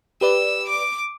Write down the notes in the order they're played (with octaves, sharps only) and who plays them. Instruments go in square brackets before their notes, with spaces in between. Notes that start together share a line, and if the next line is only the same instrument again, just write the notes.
[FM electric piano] G4 B4 D5 [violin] E6
[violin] D6 D7